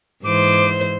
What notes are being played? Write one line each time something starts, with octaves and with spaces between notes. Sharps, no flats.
G#2 E3 C5 D6